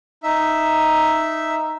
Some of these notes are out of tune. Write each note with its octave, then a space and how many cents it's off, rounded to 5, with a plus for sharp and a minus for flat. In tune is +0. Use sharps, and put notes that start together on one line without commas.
D#4 +0 E5 +0